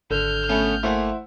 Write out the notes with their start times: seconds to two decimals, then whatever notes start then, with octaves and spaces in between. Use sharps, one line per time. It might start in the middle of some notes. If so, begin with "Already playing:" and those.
0.11 G#1 D3 F6 G6
0.49 A3 B3 C#4
0.83 A3 A#3 E4 C5 F#5 G#5